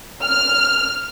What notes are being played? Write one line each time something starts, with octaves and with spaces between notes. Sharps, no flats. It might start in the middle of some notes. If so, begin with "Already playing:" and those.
F6